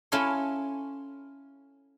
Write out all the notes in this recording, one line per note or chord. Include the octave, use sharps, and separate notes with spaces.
C#4 E4 F4 A4 C#5